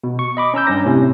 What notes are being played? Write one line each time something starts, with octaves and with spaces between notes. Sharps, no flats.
B2
C#6
D#5 B5 D6
C#4 A#5 E6 G6
G2 C#4 A#6
A2 C3 C#4